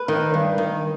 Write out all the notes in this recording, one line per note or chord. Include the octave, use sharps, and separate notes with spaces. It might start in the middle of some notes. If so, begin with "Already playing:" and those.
Already playing: B4
D#3
G2
D#3